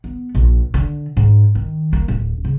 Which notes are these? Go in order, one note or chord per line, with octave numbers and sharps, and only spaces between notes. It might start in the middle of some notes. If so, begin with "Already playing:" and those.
B3
A#1
D3
G#2
D#3
A#3
D1
C#3